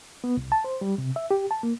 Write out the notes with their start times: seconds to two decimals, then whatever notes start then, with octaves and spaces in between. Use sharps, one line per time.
0.24 B3
0.37 C2
0.52 A5
0.64 C5
0.81 G3
0.98 C3
1.16 E5
1.31 G4
1.51 A5
1.63 A#3